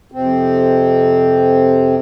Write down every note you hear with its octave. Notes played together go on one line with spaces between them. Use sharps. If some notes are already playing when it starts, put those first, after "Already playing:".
F2 C3 C4